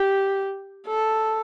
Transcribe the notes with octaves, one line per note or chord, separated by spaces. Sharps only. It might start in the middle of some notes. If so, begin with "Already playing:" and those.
Already playing: G4
A4